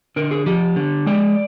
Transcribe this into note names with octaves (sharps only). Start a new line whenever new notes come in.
D3 A#4
G#4
F3 G4
D3
G#3 D5